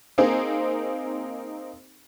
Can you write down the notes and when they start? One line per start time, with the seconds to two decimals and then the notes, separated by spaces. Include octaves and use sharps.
0.18 A#3 C4 D#4 G#4 C5